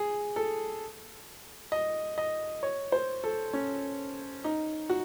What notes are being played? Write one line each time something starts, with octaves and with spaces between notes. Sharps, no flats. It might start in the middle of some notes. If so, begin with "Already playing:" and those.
Already playing: G#4
A4
D#5
D#5
C#5
C5
A4
C#4
D#4
F#4